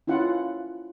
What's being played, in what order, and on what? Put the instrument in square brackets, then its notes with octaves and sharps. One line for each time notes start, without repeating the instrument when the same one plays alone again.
[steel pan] C#4 E4 F4 F#5